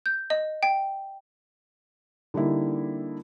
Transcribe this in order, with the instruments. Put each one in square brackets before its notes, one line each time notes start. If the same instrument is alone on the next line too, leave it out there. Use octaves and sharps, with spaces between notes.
[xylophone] G6
D#5
G5
[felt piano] D3 G3 A#3 D#4 E4